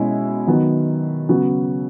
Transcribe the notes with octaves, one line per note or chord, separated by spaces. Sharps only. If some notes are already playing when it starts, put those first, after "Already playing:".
Already playing: B2 G#3 C#4 E4
D#3 F#3 B3
C#3 F#3 B3 F#4